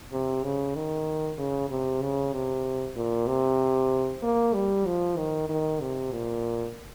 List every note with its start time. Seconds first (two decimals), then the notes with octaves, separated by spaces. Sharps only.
0.12 C3
0.43 C#3
0.75 D#3
1.38 C#3
1.70 C3
2.02 C#3
2.33 C3
2.96 A#2
3.28 C3
4.23 A#3
4.54 G3
4.86 F3
5.18 D#3
5.49 D#3
5.81 C3
6.12 A#2